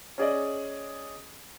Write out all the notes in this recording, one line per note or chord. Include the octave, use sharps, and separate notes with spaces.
C#4 G#4 D5 D#5